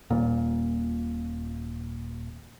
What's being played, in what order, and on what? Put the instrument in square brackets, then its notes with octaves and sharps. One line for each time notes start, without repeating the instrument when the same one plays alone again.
[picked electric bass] D#1 A#2